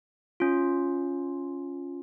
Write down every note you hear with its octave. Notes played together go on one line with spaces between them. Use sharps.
C#4 F4